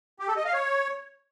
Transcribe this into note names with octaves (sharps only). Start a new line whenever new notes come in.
G4
A4
D#5
F5
C#5